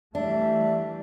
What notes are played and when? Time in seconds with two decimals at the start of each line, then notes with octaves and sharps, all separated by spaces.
0.15 E3 G3 A3 D4 E5